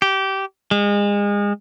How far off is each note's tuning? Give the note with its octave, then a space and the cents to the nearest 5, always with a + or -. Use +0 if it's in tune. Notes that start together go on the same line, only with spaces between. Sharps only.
G4 -20
G#3 -30